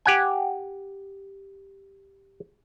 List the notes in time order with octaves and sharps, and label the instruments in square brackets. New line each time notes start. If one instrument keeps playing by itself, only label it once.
[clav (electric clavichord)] G4 F#5 G#5